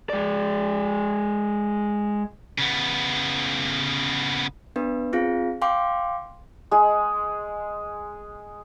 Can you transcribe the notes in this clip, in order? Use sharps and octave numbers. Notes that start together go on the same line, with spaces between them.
G#3 D5
C#3 B3
B3 D4 B4
C4 F4 G#4 F5
F5 G5 C6 D6
G#3 G#4